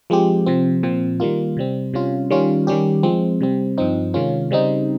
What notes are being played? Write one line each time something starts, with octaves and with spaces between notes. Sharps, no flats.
F3 G#3 C4 G4
C3 F3 C4
A#2 F3 C4
D#3 G3 A#3 F4
C3 G3 C4
C3 G3 C#4 F4
D#3 G3 C#4 F4
D#3 G3 C#4 G4
F3 G#3 C4
C3 G3 C4
G2 F3 C4 D#4
C3 D#3 G#3 C#4 F4
C#3 G3 C4 D#4